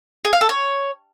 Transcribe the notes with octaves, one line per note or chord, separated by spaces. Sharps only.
G#4
F5
A4
C#5